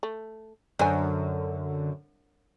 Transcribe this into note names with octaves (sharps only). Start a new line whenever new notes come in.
A3
F#2 D3 D4 C5 G#5